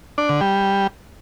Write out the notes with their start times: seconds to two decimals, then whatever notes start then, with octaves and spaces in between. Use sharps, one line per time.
0.18 D4
0.29 D3
0.41 G3